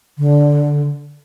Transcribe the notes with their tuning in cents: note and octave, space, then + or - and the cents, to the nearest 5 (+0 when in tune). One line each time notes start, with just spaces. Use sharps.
D3 -5